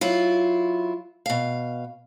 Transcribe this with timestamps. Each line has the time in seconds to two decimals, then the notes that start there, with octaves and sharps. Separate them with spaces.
0.01 F#3 E4 F4
1.26 B2 F5